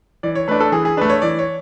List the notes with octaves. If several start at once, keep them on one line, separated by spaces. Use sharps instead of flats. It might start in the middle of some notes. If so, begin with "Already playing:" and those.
E3 D5
C#5
A3 D4 B4
A4
E3 G#4
G#4
A3 D4 B4
C#5
E3 D5
C#5